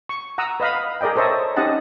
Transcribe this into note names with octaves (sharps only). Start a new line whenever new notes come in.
C#6
F#5 A#5 D#6 E6
B4 D#5 F5 B5
G#4 A#4 D5 D#5 G5
A4 C5 C#5 D#5 E5 A5
C#4 D#4 G4 D#5 F#5 A5